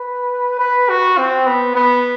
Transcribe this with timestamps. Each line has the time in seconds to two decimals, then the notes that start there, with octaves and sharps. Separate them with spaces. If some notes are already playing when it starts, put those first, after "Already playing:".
Already playing: B4
0.59 B4
0.89 F#4
1.17 C4
1.46 B3
1.75 B3